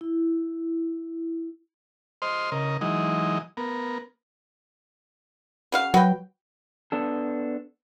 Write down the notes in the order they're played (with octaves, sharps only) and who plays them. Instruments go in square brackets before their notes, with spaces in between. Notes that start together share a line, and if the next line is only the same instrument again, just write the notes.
[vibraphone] E4
[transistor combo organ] C5 D#5 C6 F6
C#3 A#4 D#5
E3 F#3 G#3 D#4 D#5
B3 A#4
[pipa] C#3 F#4 F5
[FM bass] F#3 [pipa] F#4 B4 G5
[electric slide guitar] B3 D4 A4